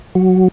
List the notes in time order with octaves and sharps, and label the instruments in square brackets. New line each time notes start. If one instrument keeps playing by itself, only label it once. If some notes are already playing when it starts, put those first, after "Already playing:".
[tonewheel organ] F#3